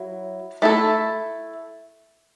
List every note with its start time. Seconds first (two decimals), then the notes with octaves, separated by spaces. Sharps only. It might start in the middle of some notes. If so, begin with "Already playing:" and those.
Already playing: F#3 E4
0.62 A3 E4 A4